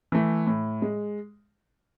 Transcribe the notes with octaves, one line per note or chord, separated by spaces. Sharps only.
E3 A3
A2
G#3